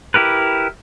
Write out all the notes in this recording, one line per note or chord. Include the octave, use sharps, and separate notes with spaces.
E4 G4 A#4 B4